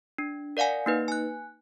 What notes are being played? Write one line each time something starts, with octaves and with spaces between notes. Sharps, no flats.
D4
A#4 D5 F5 F#5 G#5
A#3 D#4 B4
G#5 F#6